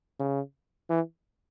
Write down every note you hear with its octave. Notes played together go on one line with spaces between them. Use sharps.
C#3
E3